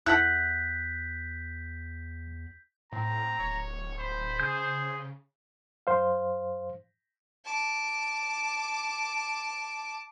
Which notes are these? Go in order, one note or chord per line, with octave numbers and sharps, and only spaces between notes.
E2 E4 A4 F#5 F#6 G6 B6
A2 C4 A#5
D1 C#5
C5 B5
C#3 G#4 G6
F#2 C5 F5
A5 D6